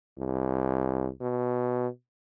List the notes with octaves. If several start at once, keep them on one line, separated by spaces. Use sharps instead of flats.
C2
B2